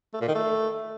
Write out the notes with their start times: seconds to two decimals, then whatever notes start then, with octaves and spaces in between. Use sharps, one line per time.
0.14 A3
0.21 A#2
0.28 D#3
0.35 A3